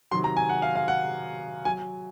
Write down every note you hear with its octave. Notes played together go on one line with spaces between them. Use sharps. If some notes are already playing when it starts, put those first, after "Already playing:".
C3 D#3 F#3 C6
A#5
G#5
F#5
F5
F5
F#5
F#3 G#5